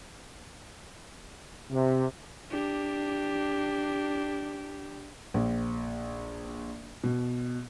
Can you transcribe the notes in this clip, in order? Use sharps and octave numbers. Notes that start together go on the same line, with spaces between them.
C3
D4 G4
A#1
B2